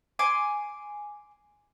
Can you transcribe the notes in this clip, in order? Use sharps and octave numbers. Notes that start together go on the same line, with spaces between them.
G#5 C6 D6